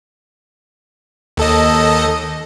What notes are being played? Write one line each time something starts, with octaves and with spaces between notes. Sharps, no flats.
D#2 A4 D#5